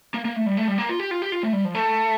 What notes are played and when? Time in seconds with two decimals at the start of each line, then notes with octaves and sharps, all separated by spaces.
0.14 A#3
0.25 A#3
0.36 A3
0.46 G3
0.57 A3
0.68 G3
0.78 A#3
0.89 F4
1.00 G4
1.11 F4
1.22 G4
1.32 F4
1.43 A3
1.53 G3
1.65 F3
1.75 A3